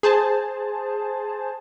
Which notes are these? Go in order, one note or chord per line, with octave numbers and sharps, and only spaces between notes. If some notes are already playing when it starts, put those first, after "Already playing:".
G#4 C5 A5